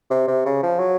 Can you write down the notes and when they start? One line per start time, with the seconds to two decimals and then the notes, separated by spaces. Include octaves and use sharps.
0.11 C3
0.28 C3
0.45 C#3
0.63 F3
0.79 F#3